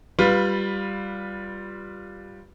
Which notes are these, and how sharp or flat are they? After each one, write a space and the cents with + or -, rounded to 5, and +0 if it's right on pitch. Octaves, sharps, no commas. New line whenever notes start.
G3 +0 F4 +10 B4 +0